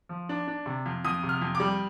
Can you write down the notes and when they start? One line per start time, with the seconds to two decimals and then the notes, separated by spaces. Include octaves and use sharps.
0.09 F3
0.29 D4
0.48 D4
0.66 C3
0.86 F2
1.05 F2 D#6
1.23 C3
1.29 F6
1.41 F2
1.55 D6
1.60 G3